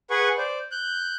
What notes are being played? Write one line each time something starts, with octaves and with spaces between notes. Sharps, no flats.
G#4 B4 F#5 G#5 C#6
C5 D5
F#6 G6